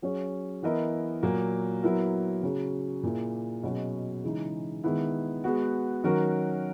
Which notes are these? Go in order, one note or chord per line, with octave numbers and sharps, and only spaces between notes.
F#3 C#4 G#4 C#5
E3 B3 E4 A#4 D#5
A#2 F#3 A#3
F#3 B3 E4 A#4
C#3 F#3 C#4
A#2 A#3 E4 G#4
B2 F#3 C#4 G#4 D#5
C#3 E3 G#3 D#4
D#3 G#3 B3 E4
G#3 B3 F#4
D#3 F#3 C#4 F#4 A#4